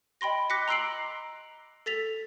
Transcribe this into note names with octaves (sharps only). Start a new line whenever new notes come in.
D#5 G5 B5 C6 A#6
D6 F#6 A#6 B6 C#7
A#5 C6 E6 C7 D7 F#7
A4 A6 B6 F7